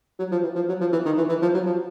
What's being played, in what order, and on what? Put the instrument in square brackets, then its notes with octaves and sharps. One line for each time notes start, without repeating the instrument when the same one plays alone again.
[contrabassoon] F#3
F3
E3
F3
F#3
F3
E3
D#3
E3
E3
F3
F#3
F3